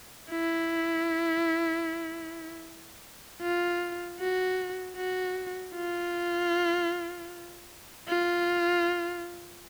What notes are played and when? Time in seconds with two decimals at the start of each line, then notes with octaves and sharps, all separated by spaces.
0.31 E4
3.42 F4
4.19 F#4
4.96 F#4
5.74 F4
8.08 F4